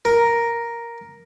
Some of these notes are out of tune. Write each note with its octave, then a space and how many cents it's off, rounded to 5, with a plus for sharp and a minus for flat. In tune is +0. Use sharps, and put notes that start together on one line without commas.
A#4 +5